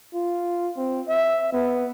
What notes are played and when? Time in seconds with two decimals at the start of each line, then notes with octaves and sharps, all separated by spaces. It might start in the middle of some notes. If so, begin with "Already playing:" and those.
0.14 F4
0.77 C4
1.08 E5
1.53 B3